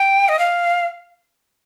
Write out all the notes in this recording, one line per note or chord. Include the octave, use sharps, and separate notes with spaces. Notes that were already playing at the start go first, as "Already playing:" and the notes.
Already playing: G5
D#5
F5